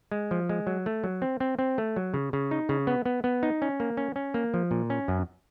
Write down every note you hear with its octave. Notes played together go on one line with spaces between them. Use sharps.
G#3
F3
G#3
F#3
A3
F#3
C4
C4
C4
A3
F#3
C#3
C#3
D#4
C#3
B3
B3
B3
D#4
C#4
A#3
C#4
C#4
A#3
F3
A#2
C#4
F#2